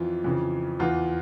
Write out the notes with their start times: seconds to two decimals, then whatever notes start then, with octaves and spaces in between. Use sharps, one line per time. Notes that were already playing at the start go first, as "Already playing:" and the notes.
Already playing: F2 E3 F4
0.24 F2 C#3 E3
0.79 E2 E3 F4